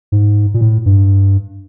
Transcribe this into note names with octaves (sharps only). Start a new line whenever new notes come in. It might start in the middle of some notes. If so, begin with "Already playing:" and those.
G#2
A#2
A2
G2